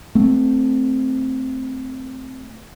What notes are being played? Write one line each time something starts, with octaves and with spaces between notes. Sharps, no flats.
A3 C4